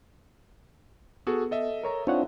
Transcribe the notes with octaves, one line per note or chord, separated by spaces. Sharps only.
B3 F#4 G#4 A4
A4 D#5 E5
A#4 C#5 A#5
C4 D4 D#4 F4 C#5 F#5